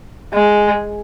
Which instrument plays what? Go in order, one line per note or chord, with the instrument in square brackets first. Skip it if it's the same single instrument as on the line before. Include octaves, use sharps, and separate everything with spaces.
[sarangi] G#3